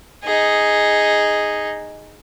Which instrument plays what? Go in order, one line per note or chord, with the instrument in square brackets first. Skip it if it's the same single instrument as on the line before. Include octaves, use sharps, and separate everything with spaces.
[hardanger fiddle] D#4 G#4